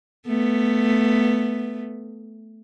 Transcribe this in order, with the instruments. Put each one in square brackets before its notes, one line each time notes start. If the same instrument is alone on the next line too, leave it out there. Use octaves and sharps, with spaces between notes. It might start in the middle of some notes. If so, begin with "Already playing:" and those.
[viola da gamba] A3 B3